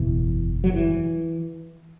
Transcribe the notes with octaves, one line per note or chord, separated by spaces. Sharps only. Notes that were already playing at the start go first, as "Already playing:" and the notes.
Already playing: F#1 E2 B2 E3
F#3
E3